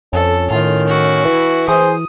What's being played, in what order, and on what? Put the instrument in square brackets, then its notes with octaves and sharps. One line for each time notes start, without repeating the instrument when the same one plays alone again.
[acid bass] F2 [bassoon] C#4 [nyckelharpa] A4
[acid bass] A2 [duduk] D#3 [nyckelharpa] F4
[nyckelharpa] E4 F#4
[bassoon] E3
[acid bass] E3 [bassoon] G#4 [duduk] C5 [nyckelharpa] D#6